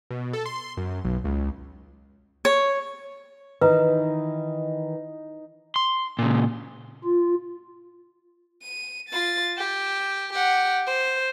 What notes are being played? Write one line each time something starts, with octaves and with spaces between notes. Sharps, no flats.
B2
A4
C6
F#2
B1
C#2
C#5
D#3 E3 D#4 B4
C6
A#2 C#3
F4
D#7
F4 A6
G4
G4 F#5
C5